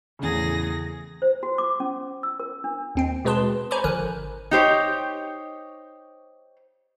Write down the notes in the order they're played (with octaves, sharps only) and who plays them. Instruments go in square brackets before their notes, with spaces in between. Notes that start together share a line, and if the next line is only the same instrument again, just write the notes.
[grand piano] E2 C#3 [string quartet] A2 G#4 A#6
[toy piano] C5
F#4
D6
C#4
E6
A#4
D4
[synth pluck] D#2 C4 G5
B2 G#3 G#4 B4 A5 C6
C5 G#5 A#5 B5 C#6 D6
G#1 D3 F3 A#4 G#5 F#6
[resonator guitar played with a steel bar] D#4 G4 C5 C#5